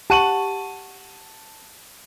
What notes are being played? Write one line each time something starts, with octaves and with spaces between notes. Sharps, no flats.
G4 F#5 A5 C#6 D#7 F#7